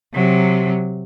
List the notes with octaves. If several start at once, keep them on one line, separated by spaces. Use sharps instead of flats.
C3 F#3